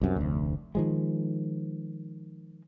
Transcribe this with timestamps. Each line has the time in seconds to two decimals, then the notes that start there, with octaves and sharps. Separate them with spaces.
0.01 C2 F#2 C3
0.16 F1 D2
0.75 D#3 F3 G#3